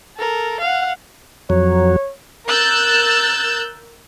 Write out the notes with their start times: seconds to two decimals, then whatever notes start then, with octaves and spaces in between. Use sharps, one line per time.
0.17 A4 A#4
0.60 F5 F#5
1.50 F2 F#3 C#5
2.47 A#4 E6 F#6 G6 A6